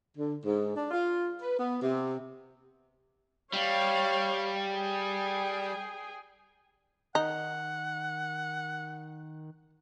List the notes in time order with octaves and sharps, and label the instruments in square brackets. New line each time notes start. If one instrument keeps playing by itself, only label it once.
[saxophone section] D3
G#2
D4
F4
B4
B3
C3
[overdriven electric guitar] G3 [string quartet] C#5 F5 G5
[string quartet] G#4 G5
[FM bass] D#3 [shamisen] D#4 [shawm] F#5